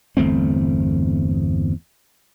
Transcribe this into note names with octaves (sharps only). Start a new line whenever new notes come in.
G1 E2 A3 C4